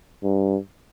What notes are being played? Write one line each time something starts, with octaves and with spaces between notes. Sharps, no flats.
G2